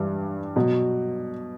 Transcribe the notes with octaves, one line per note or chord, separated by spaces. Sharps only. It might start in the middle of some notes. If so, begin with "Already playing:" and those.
Already playing: G2 E3 G3
B2 F#3